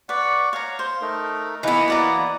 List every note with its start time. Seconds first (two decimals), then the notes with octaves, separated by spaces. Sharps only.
0.09 B4 D5 F#5 C#6
0.53 C#5 F5 A#5
0.79 C5
1.01 A3 D#4 A#4
1.63 E3 A#3 B3 D#4 E4
1.88 F#4 D5 A#5